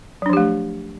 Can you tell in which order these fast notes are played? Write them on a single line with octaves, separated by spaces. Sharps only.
F#3 D4 F3 G4 A3